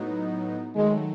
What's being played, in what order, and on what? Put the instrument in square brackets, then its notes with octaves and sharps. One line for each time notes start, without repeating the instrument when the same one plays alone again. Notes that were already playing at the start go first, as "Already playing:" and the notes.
Already playing: [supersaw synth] A2 F#3 B3 D#4
[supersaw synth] D#3 F#3 A3 [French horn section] G#3